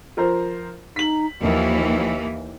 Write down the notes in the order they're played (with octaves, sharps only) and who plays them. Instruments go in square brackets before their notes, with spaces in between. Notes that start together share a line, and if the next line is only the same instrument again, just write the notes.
[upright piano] F3 A#4 C5
[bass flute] D#4 [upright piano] B6 F#7
[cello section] D#2 E3 A#3 [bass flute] F3